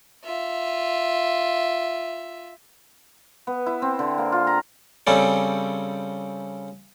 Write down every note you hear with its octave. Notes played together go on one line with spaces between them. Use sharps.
F4 E5
B3
E4
C4
D3
A#3
F4
A#5
C#3 G3 C4 C#4 A4